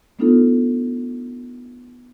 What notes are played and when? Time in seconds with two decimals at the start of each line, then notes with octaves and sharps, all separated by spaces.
0.19 A3 B3 D4 D#4 F4 A4